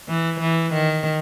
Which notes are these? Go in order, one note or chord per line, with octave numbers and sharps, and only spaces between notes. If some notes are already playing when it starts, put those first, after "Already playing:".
E3
E3
D#3